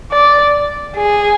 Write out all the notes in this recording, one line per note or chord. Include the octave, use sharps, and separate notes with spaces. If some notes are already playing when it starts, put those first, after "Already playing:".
D5
G#4